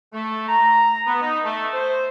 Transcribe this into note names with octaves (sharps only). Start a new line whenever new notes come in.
A3
A#5
B3
D#4
A3
C5